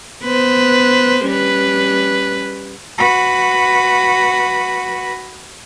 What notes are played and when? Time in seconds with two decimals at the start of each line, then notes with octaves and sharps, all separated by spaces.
0.24 B3 B4 C5
1.26 G3 C#4 B4
2.98 F#4 B4